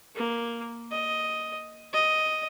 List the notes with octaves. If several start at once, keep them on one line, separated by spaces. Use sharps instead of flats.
A#3
D#5
D#5